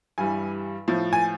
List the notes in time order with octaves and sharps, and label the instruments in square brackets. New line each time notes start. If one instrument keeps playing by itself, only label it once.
[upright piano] G2 E3 G3 G#5
A2 F3
G#5